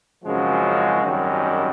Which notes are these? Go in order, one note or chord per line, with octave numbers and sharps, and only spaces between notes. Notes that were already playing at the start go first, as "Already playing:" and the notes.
G#1 F#2 C#3 F3 G#3 F#4
G#1 F#2 D#3 G3